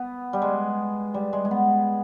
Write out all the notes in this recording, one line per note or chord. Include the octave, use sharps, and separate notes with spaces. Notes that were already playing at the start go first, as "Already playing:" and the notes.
Already playing: B3
G3
G#3
G3
G#3
G#3
B3